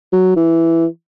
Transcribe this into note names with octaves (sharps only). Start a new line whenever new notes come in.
F#3
E3